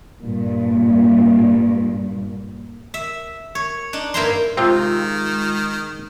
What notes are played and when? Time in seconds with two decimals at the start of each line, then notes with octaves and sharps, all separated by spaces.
0.20 G2 A#2
2.94 E5
3.55 C#5
3.93 D4 D#4
4.14 G2 A#3 E4 C5 A#5 C6
4.57 C3 D#3 G#3 C4 F4